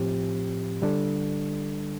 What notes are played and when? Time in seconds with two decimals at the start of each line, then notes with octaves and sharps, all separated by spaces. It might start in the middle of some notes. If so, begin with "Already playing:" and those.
Already playing: A2 F3 C4 G4
0.82 D3 G3 D4 A4